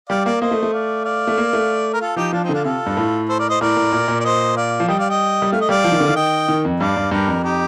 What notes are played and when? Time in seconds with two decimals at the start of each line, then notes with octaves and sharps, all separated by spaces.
0.09 G3 D5 F5
0.25 A#3 A#4 D5
0.41 A#3 C5 D#5
0.51 A3
0.63 A3
0.73 D5 F5
1.05 D5 F5
1.27 A3
1.38 A#3
1.53 A3
1.93 A#4
2.01 F4 A4
2.16 F3 D#4 G4
2.32 F3 D4 F4
2.44 C4 D#4
2.49 D3
2.54 D4 F4
2.65 C3 F4 A4
2.86 G2
2.97 A2
3.29 A4 C5
3.39 A#4 D5
3.50 C5 D#5
3.61 A2 A#4 D5
3.77 A2
3.92 A#2
4.08 A#2
4.20 D5
4.25 C5 D#5
4.57 D5 F5
4.80 F3
4.88 G3 D#5 G5
4.99 D5 F5
5.10 D#5 G5
5.42 G3
5.53 A3 F5
5.61 D#5
5.69 G3 D5 F5
5.84 F3
5.92 D#3
6.00 D3
6.08 D#3 F5
6.16 D#5 G5
6.48 D#3
6.65 F2
6.80 G2 D5 F5
6.97 G2
7.11 G2 G4 A#4
7.27 F2
7.44 D#4 G4